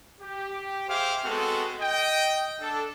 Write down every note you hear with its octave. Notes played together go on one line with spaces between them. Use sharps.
G4
G#4 C5 E5 F5 G5 D6
G#3 B3 C4 F#4 A4
D#5 G5
D4 A4